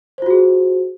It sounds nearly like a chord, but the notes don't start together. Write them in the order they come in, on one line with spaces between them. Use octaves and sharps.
C5 F4 F#4 G#4